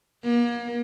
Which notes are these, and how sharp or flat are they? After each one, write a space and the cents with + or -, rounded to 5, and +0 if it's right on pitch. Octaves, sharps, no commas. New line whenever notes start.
A#3 +35